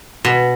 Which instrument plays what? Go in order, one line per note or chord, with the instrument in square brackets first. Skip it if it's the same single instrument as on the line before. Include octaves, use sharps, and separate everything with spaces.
[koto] B2